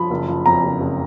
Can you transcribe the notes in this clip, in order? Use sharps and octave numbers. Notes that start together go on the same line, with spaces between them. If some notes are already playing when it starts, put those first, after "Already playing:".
Already playing: F3 B5
F#1
F3
F2 A#5
F#1
F#1